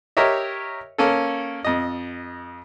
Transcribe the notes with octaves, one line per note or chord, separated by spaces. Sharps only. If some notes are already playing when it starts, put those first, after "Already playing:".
G4 A#4 C#5 D#5 E5
A#3 C#4 A4
F2 D#5